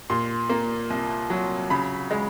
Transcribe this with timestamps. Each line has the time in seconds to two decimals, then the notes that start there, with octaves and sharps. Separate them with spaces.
0.10 A#2 C6
0.49 A#3
0.90 C2
1.30 F#3
1.70 C#3 B5
2.11 G#3